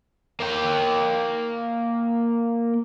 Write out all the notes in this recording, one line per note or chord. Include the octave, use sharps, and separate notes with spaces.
A#3 G5